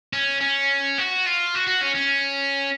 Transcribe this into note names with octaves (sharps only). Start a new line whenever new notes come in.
C#4
C#4
F#4
F4
F#4
F#4
C#4
C#4